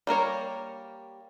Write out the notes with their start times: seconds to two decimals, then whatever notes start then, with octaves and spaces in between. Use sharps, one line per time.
0.07 G3 A#3 A#4 C#5